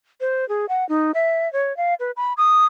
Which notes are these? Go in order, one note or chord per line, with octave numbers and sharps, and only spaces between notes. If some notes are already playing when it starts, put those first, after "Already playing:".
C5
G#4
F#5
D#4
E5
C#5
F5
B4
B5
D#6